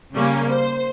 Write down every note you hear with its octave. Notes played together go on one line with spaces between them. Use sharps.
C#3 G3 A#3 C#4
C5